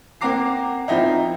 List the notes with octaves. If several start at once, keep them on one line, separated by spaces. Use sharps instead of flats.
A#3 C4 F#5 A#5 D6 C7
F3 C4 D#4 E4